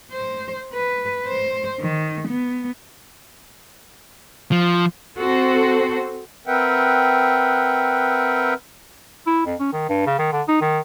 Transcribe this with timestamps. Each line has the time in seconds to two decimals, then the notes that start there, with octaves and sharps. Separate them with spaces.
0.12 C5
0.73 B4
1.27 C5
1.80 D#3
2.28 B3
4.52 F3
5.18 C4 F#4 A4 C5
6.47 C4 A#4 B4 E5 F#5 G5
9.27 E4
9.46 F2
9.60 C#4
9.73 D#3
9.89 G2
10.06 C#3
10.19 D#3
10.32 D3
10.48 D#4
10.61 D#3